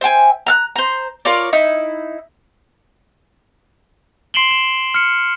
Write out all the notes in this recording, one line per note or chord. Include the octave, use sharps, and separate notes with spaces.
C5 E5 G5 G#5
A#5 E6 F#6
C5 A#5
F4 A#4 C#5 D5
D#4 E4 E6
C6 C7 D7 E7 F#7 G7
E7
F6 C#7